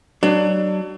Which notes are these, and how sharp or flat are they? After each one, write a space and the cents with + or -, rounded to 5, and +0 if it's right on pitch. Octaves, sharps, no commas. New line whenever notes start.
F#3 +35 D4 +30